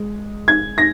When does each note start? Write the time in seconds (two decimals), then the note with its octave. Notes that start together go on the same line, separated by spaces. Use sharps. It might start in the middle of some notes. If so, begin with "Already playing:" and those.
Already playing: G#3
0.48 G#6
0.78 A#6